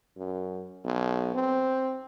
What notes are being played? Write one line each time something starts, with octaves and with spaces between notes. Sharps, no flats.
F#2
B1
C4